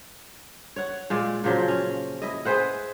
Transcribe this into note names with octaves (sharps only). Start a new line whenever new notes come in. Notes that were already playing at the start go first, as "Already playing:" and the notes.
C#5 F#5
A#2 G#3 D5
A#2 C#3 F3 F#3
C#4
E4 D#5
G#4 B4 C5 F#5